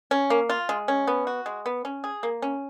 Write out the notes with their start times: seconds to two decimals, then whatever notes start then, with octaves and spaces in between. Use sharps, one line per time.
0.11 C#4
0.30 A#3
0.49 F4
0.69 G#3
0.88 C#4
1.07 B3
1.27 F#4
1.46 G#3
1.66 B3
1.85 C#4
2.04 G#4
2.23 A#3
2.42 C#4